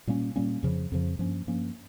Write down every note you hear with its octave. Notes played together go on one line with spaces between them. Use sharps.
A#2 G3 A#3 C#4
A#2 G3 A#3 C#4
F2 C#3 F3
F2 C#3 F3
G2 F3 A#3 C#4
G2 F3 A#3 C#4